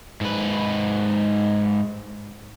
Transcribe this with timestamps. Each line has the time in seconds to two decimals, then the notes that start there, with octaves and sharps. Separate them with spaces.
0.21 G#2 B4